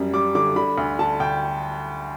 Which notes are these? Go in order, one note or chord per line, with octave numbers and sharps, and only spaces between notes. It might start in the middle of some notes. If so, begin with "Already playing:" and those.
Already playing: F#2 G3
G3 D6
D3 D6
D3 B5
D2
D3 A5
D2 G5